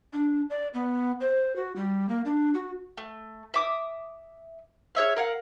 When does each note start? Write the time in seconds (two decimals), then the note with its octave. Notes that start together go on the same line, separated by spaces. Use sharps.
0.13 D4
0.50 D5
0.74 B3
1.21 C5
1.56 F#4
1.76 G3
2.09 A#3
2.25 D4
2.54 F#4
2.97 A3
3.54 E5 D6 D#6
4.95 G#4 C#5 E5 F5
5.16 A#4 F5 F#5